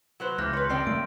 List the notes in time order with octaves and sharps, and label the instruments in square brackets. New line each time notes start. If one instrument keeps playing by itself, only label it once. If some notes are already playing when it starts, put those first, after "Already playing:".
[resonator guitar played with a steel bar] F#3 B4 C5
[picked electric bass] C#2 [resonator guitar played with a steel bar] E3 [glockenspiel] F6 G6 A#6
[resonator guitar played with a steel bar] B4 C#5 [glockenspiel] C6
[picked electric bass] C#2 [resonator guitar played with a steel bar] C4 D5 G5 [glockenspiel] C7
[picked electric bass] G2 A3 A#3 [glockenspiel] D7